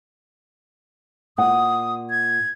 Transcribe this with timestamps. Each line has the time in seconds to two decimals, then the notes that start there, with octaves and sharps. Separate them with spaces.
1.38 A#2 F#5 D#6
2.10 G#6